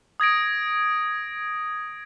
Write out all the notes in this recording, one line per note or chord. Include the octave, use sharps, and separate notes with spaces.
D#6 G#6 A#6 D7